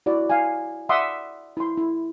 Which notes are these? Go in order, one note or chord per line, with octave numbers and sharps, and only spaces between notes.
E4 F#4 D5
F5 G#5
D5 E5 F#5 C6 D6 D#6
E4 C6
E4